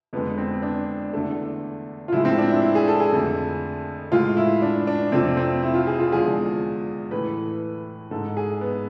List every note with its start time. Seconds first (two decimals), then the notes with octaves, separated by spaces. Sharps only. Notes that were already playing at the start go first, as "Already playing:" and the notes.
0.13 F2 D3 G#3 B3
0.38 C4
0.62 D4
1.13 E2 D3 A3
2.08 F4
2.12 A2 F3 G#3 E4
2.25 C4
2.38 D4
2.50 E4
2.62 E4
2.75 G#4
2.88 A4
3.00 G#4
3.12 F2 D3 A3
4.12 A2 G#3 F4
4.37 E4
4.62 D4
4.87 D4
5.12 F2 C3 F3 A3 C4
5.37 C4
5.63 E4
5.74 F4
5.87 G#4
5.99 F4
6.12 E2 D3 F3 G#3 G#4
7.11 A2 E3 A3 B4
8.11 G#2 G#3 A4
8.37 G#4
8.61 B3